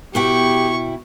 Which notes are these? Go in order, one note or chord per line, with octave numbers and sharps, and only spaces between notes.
B2 E4 G4 G5 C#6